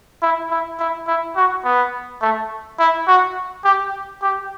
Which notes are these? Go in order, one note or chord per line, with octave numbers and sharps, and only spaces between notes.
E4
E4
E4
E4
F#4
B3
A3
E4
F#4
G4
G4